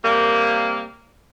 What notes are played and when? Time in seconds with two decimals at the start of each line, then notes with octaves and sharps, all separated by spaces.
0.03 C3 G3 A#3